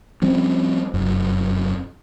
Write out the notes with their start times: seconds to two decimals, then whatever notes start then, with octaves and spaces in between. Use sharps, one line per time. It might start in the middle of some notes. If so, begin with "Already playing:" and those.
0.22 F3 G3 C4 C#4
0.94 F1 F#2